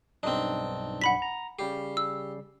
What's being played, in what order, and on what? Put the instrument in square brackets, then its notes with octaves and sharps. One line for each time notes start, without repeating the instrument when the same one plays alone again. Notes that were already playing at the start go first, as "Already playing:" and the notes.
[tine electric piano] B1 G2 D4 [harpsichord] C4 D#4
[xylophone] F#5 B5 B6
[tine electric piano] A#5
[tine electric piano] C#3 G3 C7 [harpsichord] G4
[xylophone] E6